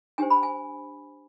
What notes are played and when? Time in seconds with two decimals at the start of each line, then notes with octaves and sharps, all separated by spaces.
0.18 D4 G4 C5 G#5
0.30 B5
0.43 G#5